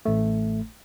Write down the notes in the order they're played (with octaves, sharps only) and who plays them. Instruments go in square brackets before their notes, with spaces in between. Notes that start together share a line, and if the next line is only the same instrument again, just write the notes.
[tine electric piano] A1 A3